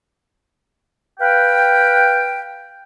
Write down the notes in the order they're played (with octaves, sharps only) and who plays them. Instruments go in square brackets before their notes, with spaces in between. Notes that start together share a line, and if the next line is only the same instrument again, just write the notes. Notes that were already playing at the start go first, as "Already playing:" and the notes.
[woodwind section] B4 F5 G5